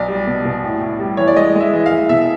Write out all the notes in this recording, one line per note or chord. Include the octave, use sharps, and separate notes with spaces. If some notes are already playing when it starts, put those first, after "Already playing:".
Already playing: B1 D5
G3
B2
B2
A2
A2
G3
E3 C#5
D5
G#3 D#5
G#3 E5
E3
F5
E3
B2 E5